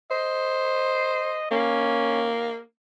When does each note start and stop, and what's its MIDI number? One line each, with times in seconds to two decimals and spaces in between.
0.11 1.46 72
0.11 1.48 75
1.51 2.59 58
1.51 2.31 61